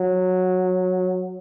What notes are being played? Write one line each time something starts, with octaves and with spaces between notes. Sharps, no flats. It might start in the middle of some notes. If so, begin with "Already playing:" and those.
Already playing: F#3